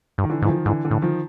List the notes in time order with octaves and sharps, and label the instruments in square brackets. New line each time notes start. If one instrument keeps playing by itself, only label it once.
[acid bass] G2
[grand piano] D#3
D3 E3
[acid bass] G#2 [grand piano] E3
[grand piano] D#3 F3
[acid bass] G#2 [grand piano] D3 E3
[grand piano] D3 E3
[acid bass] A2
[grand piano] D#3 F3